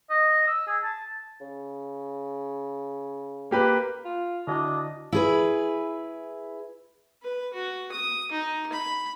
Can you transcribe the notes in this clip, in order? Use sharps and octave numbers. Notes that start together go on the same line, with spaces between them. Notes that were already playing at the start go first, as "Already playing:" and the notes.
D#5
E6
G#4
A5
C#3
A#3 G4 B4
F4
D3 D4 E4 F#4 D#5
E4 G#4 B4
B4
F#4
D#6
D#4
B5